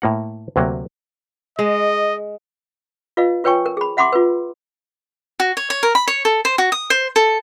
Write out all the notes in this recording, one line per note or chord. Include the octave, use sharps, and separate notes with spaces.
A2 A#3 F#5
D2 C3 F#3 A#3
G#3 D#5
F4 B4 D#5 F5
F4 B4 C#5 G5 G#5 C#6
A#4
G#4 B5
E5 F#5 B5 C6 D6
F4 B4
F#4
C#5
C#5
A#4
B5
C#5
A4
C5
F#4
D#6
C5
A4